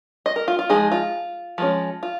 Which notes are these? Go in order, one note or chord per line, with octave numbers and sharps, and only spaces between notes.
D#5
A#4
F4
F4
F3 G#3 D#4 G#4
F4
F3 G#3 C#4
F4